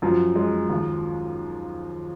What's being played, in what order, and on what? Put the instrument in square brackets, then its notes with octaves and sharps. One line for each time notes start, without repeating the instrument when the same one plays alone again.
[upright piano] F#2 [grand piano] F3
[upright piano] G#3
D#2